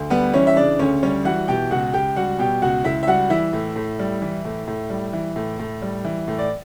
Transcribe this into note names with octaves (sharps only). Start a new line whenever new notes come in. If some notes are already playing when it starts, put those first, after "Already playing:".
Already playing: D2
G3 B3 B4
E3 C#4 C#5
E5
C#3 D4 D5
D2 C#4 C#5
G3 C#4 C#5
E3 F#4 F#5
B2 G4 G5
C#2 F#4 F#5
C#2 G4 G5
G3 F#4 F#5
B2 G4 G5
C#2 F#4 F#5
C#2 E4 E5
E5
G3 F#4 F#5
E3 E4 E5
A2
A2
G3
E3
A2
A2
G3
E3
A2
A2
G3
E3
A2
D5